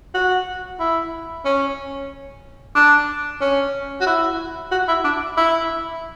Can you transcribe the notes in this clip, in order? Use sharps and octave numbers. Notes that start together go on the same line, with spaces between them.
F#4
E4
C#4
D4
C#4
F#4
E4
F#4
E4
D4
E4